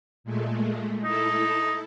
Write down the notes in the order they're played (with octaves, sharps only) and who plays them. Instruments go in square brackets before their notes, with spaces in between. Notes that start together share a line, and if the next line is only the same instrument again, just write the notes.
[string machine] A#2 G#3 A3
[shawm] D#4 [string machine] E4 A4